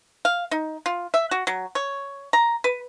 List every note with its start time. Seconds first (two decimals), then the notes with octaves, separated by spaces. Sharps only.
0.25 F5
0.51 D#4
0.86 F4
1.14 E5
1.31 F#4
1.47 F#3
1.75 C#5
2.33 A#5
2.64 B4